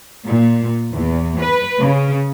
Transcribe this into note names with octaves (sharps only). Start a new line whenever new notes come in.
A#2
E2
B4
C#3